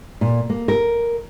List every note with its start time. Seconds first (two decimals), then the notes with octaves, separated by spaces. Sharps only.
0.21 A#2
0.50 A#3
0.68 A#4